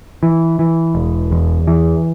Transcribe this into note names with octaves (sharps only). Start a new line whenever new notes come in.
E3
E3
E1
E2
E3